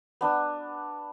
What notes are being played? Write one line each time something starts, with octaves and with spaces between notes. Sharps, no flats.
B3 D4